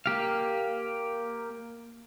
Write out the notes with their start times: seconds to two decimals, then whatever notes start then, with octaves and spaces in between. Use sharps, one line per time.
0.06 A#3 G4 F5